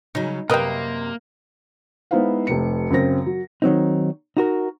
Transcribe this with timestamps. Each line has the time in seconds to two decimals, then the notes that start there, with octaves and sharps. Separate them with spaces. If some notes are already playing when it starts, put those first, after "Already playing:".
0.15 C#3 F#3 D#4
0.50 F#2 C3 A#3 G4 A#4 B4 D#5 G5
2.11 G#3 B3 D#4 E4 C5 F5
2.47 F1 C3 C#7
2.90 F#2 C#3 C4 A#6
3.26 F#3
3.62 D#3 F#3 C4 D#4
4.37 D#4 F#4 A#4